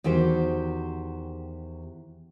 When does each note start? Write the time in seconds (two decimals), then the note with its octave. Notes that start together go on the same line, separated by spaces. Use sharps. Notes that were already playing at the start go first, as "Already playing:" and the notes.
0.04 E2 D#3 F#4 G4 C5